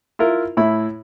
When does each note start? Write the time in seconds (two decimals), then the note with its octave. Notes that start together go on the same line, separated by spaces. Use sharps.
0.19 E4 F4 A#4
0.57 A2 E4 B5